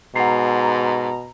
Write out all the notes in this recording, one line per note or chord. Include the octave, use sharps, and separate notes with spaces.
G#2 B2 F#5 A#5 C7